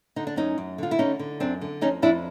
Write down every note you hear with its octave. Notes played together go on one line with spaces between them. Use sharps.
D3 D#4
D4
F#2 C#4 D#4
F#2
D3 F4
E4
D3 C#4 D#4
D3
F#2 C4 D4
D3
F2 C#4 D#4
F2 D4 E4